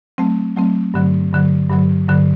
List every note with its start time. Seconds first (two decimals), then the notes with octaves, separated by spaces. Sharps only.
0.18 F#3 A3 C4
0.57 F#3 A3 C4
0.94 G2 D3 F#3
1.32 G2 D3 F#3
1.69 G2 D3 F#3
2.08 G2 D3 F#3